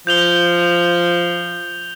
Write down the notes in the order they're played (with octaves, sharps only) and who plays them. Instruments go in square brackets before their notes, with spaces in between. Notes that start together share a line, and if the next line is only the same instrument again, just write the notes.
[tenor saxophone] F3 [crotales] G6 F7 G7